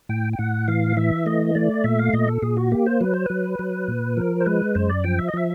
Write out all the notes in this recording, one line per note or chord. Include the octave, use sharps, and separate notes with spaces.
A2 G5
G5
A2 F#5
E3 F5
E3 E5
A3 D#5
A3 D5
A#2 E5
F5
A#2 D#5
A4
A#2 G#4
F#4
A#3 G4
C5
F#3 B4
C5
F#3 B4
F#3
A#2
F3 A#4
C5
G#3 B4
F#2 C5
D5
F3 G5
E5
D#5
F3 E5